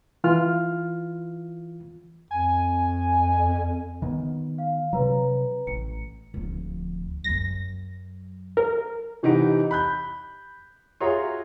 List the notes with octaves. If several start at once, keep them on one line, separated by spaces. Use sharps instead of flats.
E3 F4 F6
F2 G#5
D#3 B3
F5
C3 F#3 B4 A#5
A1 C#7
D1 F3
F#2 F#3 A#6
A#4
C3 E3 D#4 G4 F#5 D7
B5 F#6 G6
F4 F#4 G#4 C#5 E5 A#5